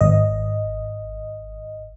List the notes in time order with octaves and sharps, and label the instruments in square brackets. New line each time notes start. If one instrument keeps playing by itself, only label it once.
[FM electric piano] G#1 D#5